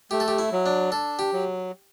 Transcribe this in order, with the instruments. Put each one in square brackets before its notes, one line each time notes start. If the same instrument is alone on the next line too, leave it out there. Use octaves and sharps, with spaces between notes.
[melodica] A3 [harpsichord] G4
[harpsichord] A4
G4
E4
[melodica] F#3
[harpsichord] D4
[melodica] D4 [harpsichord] A4
[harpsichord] G4
[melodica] F#3